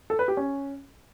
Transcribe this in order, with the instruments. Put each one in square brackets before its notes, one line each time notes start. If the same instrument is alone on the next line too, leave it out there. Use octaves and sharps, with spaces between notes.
[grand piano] A4
B4
G4
C#4